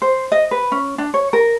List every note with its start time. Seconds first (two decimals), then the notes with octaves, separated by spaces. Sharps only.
0.02 C5
0.32 D#5
0.51 B4
0.72 C#4
0.98 D4
1.14 C#5
1.33 A#4